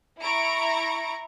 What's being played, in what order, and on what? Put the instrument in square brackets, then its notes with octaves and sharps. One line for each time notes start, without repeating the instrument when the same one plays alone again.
[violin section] E4 A#5 C#6 D7